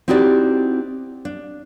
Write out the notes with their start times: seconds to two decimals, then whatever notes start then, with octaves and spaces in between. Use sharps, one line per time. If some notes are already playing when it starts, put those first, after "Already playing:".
0.08 C4 D#4 E4 F#4 G4 D5
1.25 D4